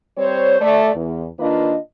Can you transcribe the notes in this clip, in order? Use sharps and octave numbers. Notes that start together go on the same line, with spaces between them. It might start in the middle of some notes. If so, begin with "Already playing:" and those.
G3 C4 C5 C#5
A3 D5
E2
D#3 A#3 D4 F4 B4 D#5